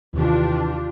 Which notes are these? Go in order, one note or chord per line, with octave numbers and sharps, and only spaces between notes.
D#2 C3 D#3 E3 D4 F4 G4